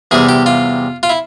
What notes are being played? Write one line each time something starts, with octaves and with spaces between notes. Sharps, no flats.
E2 C3 G3 G#4
G4
F4
F4
E4